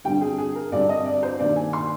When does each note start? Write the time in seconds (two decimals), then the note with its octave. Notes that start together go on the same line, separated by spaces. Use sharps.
0.04 G2 D3 G3 C4 G5
0.21 G#4
0.38 G#4
0.55 A#4
0.72 G2 D3 G3 C4 D5
0.89 D#5
1.06 D5
1.23 C5
1.40 G2 D#3 A#3 D5
1.56 G#5
1.73 C6